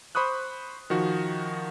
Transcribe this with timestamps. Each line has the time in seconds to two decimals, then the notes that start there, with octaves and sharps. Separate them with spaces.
0.15 C5 B5 C#6 D#6 F#6
0.90 D#3 F3 F#4